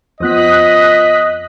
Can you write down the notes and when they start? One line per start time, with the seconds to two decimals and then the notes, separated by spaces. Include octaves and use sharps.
0.20 F2 B3 F4 C5 D#5 D#6 F#6 B6